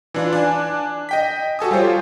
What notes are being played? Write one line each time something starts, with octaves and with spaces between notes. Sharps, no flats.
E3 D4 F4
D4 G#5
D#5 G5 B6
F#4 A4 G#5 D#6
G3 F4 C5 C#5